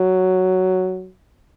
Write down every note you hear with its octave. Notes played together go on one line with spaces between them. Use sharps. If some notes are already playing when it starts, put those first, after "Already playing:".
Already playing: F#3